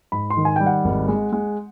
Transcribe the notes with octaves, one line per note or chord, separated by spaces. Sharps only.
G#2 B5
C6
D#3
G#5
G3 G5
F#5
G#1
G#3
G#3